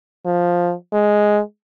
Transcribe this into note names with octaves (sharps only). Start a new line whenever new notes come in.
F3
G#3